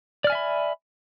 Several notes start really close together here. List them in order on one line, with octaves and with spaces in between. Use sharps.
D5 F6 G#5 E5 B5